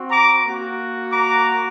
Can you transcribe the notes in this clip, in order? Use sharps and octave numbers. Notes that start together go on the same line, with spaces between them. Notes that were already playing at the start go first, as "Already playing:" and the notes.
Already playing: C4 F#4
A#5 D6
A#3 F#4
A#5 D6